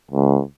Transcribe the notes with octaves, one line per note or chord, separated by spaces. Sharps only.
C#2